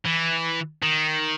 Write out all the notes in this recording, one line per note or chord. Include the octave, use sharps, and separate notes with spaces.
E3
D#3